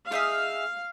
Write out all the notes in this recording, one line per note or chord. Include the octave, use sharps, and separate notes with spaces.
D#4 G#4 E5 F5